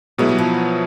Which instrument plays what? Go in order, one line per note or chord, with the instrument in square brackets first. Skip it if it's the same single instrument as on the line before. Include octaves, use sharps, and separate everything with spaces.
[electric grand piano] B2 F#3 B3 E4 [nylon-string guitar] G#3
[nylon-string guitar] G3
F3